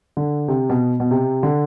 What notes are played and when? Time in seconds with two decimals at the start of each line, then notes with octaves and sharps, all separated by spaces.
0.17 D3
0.48 C3
0.70 B2
1.00 B2
1.11 C3
1.43 D3